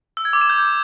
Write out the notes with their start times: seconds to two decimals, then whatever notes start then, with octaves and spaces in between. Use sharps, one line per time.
0.17 E6
0.25 G#6
0.33 D6
0.41 E7
0.49 G6